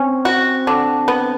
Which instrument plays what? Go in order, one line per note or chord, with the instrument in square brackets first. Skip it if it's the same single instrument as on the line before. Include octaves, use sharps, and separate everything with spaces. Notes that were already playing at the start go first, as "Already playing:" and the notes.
Already playing: [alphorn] C4 [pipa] C#4
[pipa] F#4
D3
B3